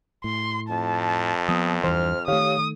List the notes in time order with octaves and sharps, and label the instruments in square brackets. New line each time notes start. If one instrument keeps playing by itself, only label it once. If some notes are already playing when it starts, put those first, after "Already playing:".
[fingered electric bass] A2 [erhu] C6
[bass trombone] F2 [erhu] A5
[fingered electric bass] F3 B3 [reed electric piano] D#6
[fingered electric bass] E2 G2 E3 [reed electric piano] C5 [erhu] F6
[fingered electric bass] D#3 A3 [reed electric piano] G4 C#5 F5 [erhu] D#6